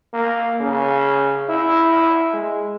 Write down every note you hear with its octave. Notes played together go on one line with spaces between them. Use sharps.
A#3
C#3
E4
G#3